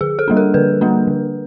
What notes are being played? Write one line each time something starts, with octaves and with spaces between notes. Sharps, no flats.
D3 G#4
A4
G3 A#3 D4
A#4
D3 B4
G3 A#3 D4
D3